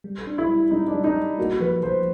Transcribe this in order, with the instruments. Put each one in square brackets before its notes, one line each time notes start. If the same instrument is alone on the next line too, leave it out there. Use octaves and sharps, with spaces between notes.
[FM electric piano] G3
D4
[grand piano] E4
[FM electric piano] G3
[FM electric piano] G3 [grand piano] D#4
[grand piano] D4
[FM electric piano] G3
[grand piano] D#4
[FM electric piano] G3
[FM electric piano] A#3 [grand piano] F#4
[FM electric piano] F3 [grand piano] B4
[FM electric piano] F3 [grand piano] C5